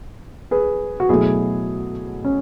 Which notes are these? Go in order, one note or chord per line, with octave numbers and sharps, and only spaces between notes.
G#4 B4
F#4
B2 F#3 A3 E4 G#4
C#4